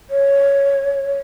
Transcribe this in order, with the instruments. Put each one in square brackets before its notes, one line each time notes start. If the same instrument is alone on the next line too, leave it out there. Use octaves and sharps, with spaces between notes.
[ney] C#5